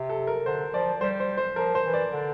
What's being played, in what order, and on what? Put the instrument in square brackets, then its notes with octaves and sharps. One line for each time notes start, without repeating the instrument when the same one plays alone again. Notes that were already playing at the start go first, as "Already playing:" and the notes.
Already playing: [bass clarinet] C3
[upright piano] A4
A#4
[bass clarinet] D3 [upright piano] C5
[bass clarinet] F3 [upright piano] D5
[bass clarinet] G3 [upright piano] C5
[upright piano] C5
C5
[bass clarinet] F3 [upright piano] A#4
[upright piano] C5
[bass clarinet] E3
[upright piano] D5
[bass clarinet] D3